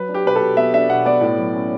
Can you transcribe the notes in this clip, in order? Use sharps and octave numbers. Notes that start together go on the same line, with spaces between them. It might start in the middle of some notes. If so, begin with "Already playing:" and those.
Already playing: F#3 B4
D4
G4
B2 B4
A4
B2
B3 E5
D4 E5
B2 F#5
B3 D5
A2
F#3
C#4